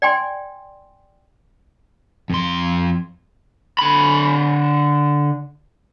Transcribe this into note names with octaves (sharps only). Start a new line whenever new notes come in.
D5 G5 G#5 C6
F2 C6
D3 B5